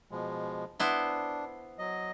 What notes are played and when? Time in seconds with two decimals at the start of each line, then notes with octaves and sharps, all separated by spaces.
0.11 B2 F3 G#3
0.80 B3 D4 E4 C5
1.79 F#3 D#5